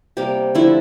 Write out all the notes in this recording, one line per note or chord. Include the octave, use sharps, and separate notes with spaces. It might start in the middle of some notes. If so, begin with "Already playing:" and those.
C3 G3 A#3 G4
D3 F3 A3 E4